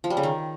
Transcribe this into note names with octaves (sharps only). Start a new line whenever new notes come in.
F3
G3
C#3
D#3